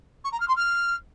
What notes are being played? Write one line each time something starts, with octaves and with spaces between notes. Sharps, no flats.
C#6
A#5
F6
C6
F6